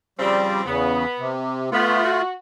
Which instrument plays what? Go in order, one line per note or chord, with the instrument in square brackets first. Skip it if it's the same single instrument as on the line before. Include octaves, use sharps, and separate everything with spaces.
[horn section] C#3 F3 C4 [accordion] G3
[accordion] E2 C#3 [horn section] B3
[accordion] C3
[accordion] A3 F4 [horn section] B3
[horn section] F#4